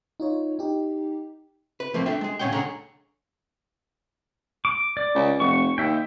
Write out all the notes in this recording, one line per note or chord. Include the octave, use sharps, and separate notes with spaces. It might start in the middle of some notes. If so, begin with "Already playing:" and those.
D#4 F4 C#5
D#4 G4
B4
F3 A3 A#3 C4
D4 A4 E5 G5
G#3 G#4
A#2 C#4 C#5 F#5 G5
C#2 D3 G#4 C#5 F#5 A#5
D6
D5
C#2
F1 C#6
D#2 E5 G5